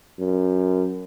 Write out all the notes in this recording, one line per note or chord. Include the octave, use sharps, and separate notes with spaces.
F#2